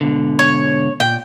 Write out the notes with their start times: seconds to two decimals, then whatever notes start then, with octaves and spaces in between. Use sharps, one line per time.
0.01 G#2 B2 D3
0.39 C#5
1.00 A#2 G5